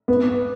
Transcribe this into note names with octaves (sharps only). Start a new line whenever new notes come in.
B3